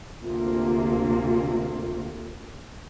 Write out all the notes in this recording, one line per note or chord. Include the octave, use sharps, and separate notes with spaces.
D2 C3 A#3 F4